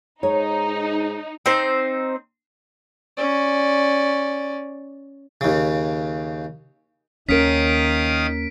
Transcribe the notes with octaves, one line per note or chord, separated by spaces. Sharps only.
G#2 D#4 C#5 A#5
C4 D#4 C5
C#4 D5
D#2 C#3
D#2 D#3 C#4 A#4 F5 D#6 B6 D7